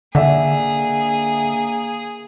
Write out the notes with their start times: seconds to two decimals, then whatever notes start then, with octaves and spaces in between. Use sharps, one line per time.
0.15 D3 A#3 G#4 D5 E5 F#5